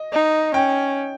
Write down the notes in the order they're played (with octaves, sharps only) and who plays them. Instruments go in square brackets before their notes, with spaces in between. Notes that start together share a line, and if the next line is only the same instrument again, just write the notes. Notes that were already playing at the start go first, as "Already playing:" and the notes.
Already playing: [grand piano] D#5
[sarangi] D#4
[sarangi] C#4 [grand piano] G5